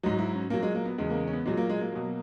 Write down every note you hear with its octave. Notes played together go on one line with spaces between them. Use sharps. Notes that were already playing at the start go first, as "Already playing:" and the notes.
G#2 F#3 D#4
E4
C#4
A#2 F#3 A#3
G#3
A#3
B3
E2 C#3 G#3
A#3
C#4
B3
A#2 F#3 G#3
A#3
G#3
A#3
B2 F#3